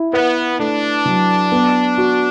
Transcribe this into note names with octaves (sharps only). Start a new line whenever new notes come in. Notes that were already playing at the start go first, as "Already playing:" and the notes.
Already playing: E4
B3 B4
A3 D4
F#3
B3
F#4